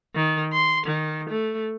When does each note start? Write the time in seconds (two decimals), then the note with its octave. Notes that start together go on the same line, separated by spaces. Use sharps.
0.15 D#3
0.53 C6
0.86 D#3
1.30 A3